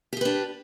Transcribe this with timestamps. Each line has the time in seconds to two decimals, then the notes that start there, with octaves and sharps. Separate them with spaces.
0.13 G4
0.17 G#4
0.21 B4
0.25 D4